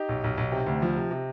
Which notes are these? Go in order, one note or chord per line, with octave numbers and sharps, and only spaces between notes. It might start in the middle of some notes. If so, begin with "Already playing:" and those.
Already playing: D#4 G4
B1
B1
B1
C3
D2
F3
C3
C3